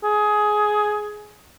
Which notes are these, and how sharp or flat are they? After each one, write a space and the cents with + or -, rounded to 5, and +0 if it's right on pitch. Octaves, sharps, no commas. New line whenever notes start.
G#4 +15